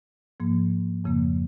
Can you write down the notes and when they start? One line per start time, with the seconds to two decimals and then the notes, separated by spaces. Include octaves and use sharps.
0.40 G#2 F3 A#3
1.04 F2 C#3 F3 A#3